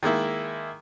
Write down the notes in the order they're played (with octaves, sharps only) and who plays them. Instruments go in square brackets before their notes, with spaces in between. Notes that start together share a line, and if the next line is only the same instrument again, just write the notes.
[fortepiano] D#3 G#3 A#3 E4